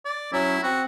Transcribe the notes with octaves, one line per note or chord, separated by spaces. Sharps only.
D5
F#3 C#4 E4
C4 F#4